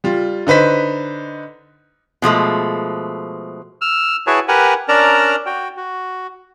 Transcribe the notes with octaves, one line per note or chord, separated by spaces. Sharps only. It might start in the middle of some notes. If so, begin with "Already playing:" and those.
G3 F4
D3 D#4 B4 C5 B6
B2 F3 G#3 A3
E6 F6
E4 F#4 G#4 B4 C#5 A5
G4 A#4 B4 F#5 G#5
C#4 D4 A#4 D5 A5 A#5
F#4 G5
F#4